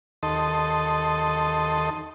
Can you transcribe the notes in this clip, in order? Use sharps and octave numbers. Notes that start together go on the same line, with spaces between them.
D#2 A4 D#5 C6